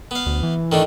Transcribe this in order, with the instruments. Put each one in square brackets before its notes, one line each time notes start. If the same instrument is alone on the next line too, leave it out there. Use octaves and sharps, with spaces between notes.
[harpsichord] B3 F5
[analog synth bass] D2
E3
[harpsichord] D#3 A3 D4